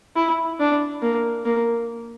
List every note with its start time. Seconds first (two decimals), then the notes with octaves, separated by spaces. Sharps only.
0.16 E4
0.60 D4
1.02 A#3
1.45 A#3